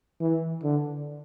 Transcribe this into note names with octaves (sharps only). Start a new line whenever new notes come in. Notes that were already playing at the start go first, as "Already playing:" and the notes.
E3
D3